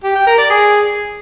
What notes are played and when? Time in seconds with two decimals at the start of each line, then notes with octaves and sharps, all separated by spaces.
0.04 G4
0.15 G5
0.27 A#4
0.38 D5
0.50 G#4